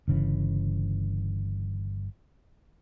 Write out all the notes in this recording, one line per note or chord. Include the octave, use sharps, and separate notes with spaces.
G1 C#3 E3